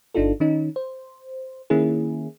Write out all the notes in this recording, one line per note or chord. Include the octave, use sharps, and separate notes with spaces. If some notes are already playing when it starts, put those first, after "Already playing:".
G1 D4 D#4 F4 A4
D#3 C#4 D#4
C5
D#3 A#3 C#4 E4 G#4